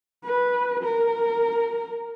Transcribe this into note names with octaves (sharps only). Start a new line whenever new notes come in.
B4
A#4